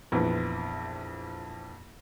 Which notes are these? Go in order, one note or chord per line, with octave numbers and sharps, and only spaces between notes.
A#1 F2 E3 B3